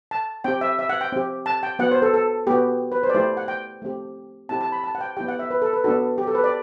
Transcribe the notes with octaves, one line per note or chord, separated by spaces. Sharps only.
A5
C4 G4 G5
E5
E5
F#5
G5
C4 G4
A5
G5
B3 F#4 F#5
C5
A4
A4
B3 F#4 G4
B4
C5
D5
A3 E4 G4 C5
F#5
G5
A3 C4 G4
C4 E4 G4 A5
A5
B5
A5
F#5
G5
B3 E4 G4 G5
F#5
E5
B4
A4
B4
B3 D4 F#4 A4
G4
A4
B4
D5